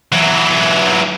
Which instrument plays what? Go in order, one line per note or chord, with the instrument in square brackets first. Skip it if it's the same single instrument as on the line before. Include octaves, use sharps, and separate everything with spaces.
[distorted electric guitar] E3 F#3